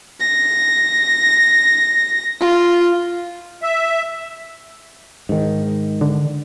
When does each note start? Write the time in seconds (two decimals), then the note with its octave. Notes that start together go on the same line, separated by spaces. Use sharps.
0.20 A#6
2.40 F4
3.63 E5
5.29 G#2 D#3
6.01 D3